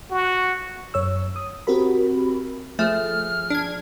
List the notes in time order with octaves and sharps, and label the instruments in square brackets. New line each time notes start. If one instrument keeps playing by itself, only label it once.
[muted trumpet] F#4
[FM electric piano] F#2 C#5 E6
D#6
C4 F#4 G4 A#4 B5
[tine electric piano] F3 G#4 [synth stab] A3 [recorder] F6
[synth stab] D4 G#6